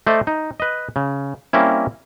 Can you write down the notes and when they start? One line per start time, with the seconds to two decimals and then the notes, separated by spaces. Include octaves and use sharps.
0.07 A3 C5 D5 D#5
0.27 D#4
0.60 B4 D#5
0.96 C#3
1.53 G3 A#3 C4 C#4 E4